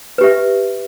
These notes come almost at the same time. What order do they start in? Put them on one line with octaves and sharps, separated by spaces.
B4 G4 E5